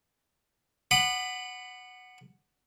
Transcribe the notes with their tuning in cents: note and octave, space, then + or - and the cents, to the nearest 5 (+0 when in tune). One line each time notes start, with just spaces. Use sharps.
F#5 +0 B5 +15 D#6 -45